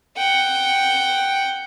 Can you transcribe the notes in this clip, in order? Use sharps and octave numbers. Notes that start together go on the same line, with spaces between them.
F#5 G5